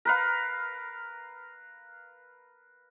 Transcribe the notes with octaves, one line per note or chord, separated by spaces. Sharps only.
A#4 B4 F5